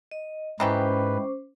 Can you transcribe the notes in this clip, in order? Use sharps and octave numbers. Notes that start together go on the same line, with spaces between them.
D#5
G#2 D#3 E3 C#4 G4 B4 C5 D6